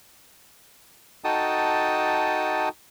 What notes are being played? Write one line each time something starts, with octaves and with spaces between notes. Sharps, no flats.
D#4 F#4 A4 G5 A5 D#6